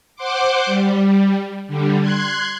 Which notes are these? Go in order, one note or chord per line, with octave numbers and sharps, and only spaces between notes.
C5 F#5 C6 D6
G3
D3 G3
C6 F#6 G#6